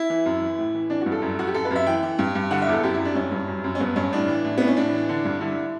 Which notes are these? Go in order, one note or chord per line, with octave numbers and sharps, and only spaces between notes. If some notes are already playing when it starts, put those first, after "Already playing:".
Already playing: E4
E3
F#2
E3
A2
E3
E3 D4
F#4
G2
A4
F#2
F#2 F#4
G4
F#2 A4
B4
F#2 E5
E3 G5
E3
G2
G2
D3 F#5
E5
E2 A4
F#2 G4
E4
F#2
D4
G2 C#4
G2
F#2
F#2
C#4
G2 B3
G2 C#4
A2 D4
E3
A2
A2 B3
C#4
A2 D4
E3
D3
G2
D3 E4